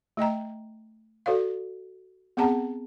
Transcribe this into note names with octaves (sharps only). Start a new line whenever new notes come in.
A3 D#5 G5 A#5
F#4 A4 C5 D5 F5
B3 C4 G#4 F#5 A5 A#5